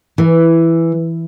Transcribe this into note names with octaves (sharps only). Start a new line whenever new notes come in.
E3